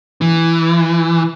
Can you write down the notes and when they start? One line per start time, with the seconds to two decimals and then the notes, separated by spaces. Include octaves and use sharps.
0.21 E3